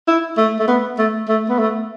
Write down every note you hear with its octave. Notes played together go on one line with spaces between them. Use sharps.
E4
A3
A3
B3
A3
A3
B3
A3